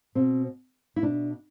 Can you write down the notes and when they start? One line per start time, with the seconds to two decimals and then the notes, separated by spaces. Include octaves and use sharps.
0.15 B2 C4
0.96 E4
1.02 B2 D4